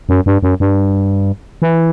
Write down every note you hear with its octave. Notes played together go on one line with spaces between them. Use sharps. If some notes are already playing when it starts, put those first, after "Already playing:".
F#2
G2
F#2
G2
E3